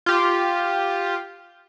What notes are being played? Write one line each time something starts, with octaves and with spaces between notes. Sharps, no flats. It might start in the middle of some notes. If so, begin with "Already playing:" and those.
F4 G4